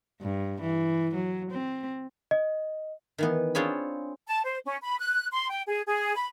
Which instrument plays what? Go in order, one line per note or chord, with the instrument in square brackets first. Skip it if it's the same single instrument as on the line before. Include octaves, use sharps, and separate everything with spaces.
[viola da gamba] G2
E3
F#3
C4
[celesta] D#5
[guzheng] D#3 E3 B3
C4 D4 F4 G#4 C#5 B5
[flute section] A5
C5
C#4
B5
F#6
C6
G5
G#4
G#4
B5